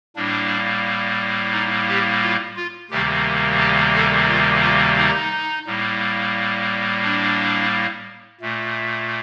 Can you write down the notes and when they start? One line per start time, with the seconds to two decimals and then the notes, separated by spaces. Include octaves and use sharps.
0.16 A2 G3 A#3 D4
1.53 D#4
1.88 G4
2.22 F4
2.57 F4
2.90 D2 C3 D#3 G3 A#3 G4
3.60 G4
3.94 A4
4.28 F4
4.62 F4
4.97 D#4
5.66 A2 G3 A#3
7.04 D4
8.41 A#2 A3